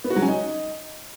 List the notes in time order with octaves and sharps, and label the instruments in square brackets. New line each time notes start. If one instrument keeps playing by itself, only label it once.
[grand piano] B3
F#4
F#3
C#4
D#4